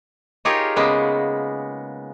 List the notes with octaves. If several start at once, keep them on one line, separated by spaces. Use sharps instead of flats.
D#4 F4 G4 G#4 A#4 C#5
C#3 G#3 A#3 B3